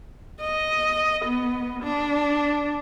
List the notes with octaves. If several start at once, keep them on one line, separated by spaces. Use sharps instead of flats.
D#5
B3
D4